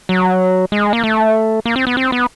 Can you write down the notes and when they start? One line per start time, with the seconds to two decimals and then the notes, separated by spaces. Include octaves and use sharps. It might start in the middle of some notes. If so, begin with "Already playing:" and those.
0.09 F#3
0.72 G#3
0.93 A#3
1.04 A3
1.65 A#3
1.76 C4
1.87 B3
1.97 C4
2.12 B3